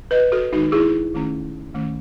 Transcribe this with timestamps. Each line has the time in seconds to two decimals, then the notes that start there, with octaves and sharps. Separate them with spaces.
0.11 B4 D#5
0.32 F#4 A4
0.53 D#3 G#3 D#4 F#4
0.72 E4 G#4
1.14 D#3 A3 C#4
1.75 D#3 A3 C#4